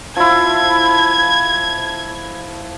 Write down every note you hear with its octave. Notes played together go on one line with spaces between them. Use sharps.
F3 E4 G#6